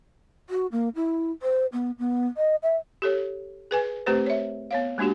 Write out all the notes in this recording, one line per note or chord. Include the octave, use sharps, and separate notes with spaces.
F#4
A#3
E4
C5
B3
B3
D#5
E5
G4 A4 C#5
G#4 B4 G#5
A3 C4 G4 B4 C5
C#5 E5
B3 C#5 F5
G#3 A#3 D4 F#4 G4